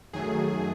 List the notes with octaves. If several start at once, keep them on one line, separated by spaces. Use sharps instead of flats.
F#2 D#3 F#3 A3 G#4